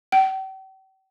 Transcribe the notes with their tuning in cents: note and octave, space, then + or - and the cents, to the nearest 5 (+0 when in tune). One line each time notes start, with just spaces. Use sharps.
G5 -40